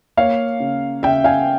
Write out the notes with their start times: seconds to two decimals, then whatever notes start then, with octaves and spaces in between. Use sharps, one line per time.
0.17 A#3 C#5 F5
0.60 C#3
1.03 C#3 E5 G5
1.24 F5 G#5